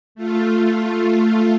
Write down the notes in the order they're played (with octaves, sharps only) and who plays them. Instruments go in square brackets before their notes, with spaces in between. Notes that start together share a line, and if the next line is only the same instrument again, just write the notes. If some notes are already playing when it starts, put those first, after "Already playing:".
[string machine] A3 F4